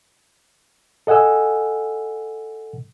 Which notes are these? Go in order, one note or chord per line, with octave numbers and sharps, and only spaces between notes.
A4 D#5 F#5 G#5 E6